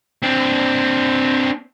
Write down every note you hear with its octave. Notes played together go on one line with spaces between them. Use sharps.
C4 D4